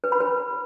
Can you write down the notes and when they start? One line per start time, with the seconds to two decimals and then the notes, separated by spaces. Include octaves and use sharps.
0.04 B4
0.12 B5
0.20 B4